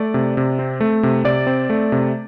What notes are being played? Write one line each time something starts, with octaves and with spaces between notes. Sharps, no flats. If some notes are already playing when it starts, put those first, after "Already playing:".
Already playing: A3 D5
C3
C3
C4
A3
C3
C3 D5
C4
A3
C3